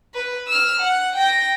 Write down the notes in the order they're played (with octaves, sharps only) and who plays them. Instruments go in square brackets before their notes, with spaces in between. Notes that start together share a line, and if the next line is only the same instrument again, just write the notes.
[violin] B4
E6 F6
F#5
G5 A#6